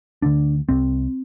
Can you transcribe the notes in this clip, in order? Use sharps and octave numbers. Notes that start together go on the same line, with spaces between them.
D2 D3 D4
C2 C3 C4